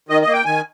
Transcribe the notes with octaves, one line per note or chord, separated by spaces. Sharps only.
D#3 D#5
D#5
A#3
G5
D#3 G#5